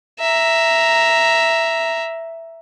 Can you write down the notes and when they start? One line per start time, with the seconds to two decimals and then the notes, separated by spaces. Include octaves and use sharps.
0.20 E5 A#5